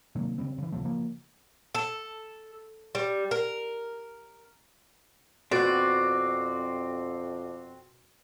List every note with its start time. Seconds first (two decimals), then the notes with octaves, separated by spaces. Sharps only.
0.15 C3 D#3 F#3 A#3
0.38 C#3 F#3 G3 C4
0.58 C#3 E3
0.72 D1 C3 F3 A3
0.85 C#3 F3 A#3
1.75 A4
2.95 G3
3.31 A#4
5.51 F2 B2 C4 F#4 D5